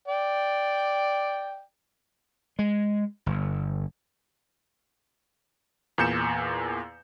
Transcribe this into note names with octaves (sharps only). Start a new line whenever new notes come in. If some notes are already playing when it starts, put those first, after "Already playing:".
D5 G5
G#3
G1
E2 A#2 G6 C#7 E7